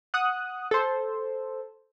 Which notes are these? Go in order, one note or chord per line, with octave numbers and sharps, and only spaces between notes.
F#5 D#6 F#6
A4 C5